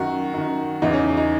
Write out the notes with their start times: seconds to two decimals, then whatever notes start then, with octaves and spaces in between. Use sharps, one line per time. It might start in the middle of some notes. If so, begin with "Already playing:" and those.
Already playing: F#2 D#3 F#4
0.34 F#2 D#3
0.82 E2 C#3 E3 D#4
0.93 C#4
1.17 D#4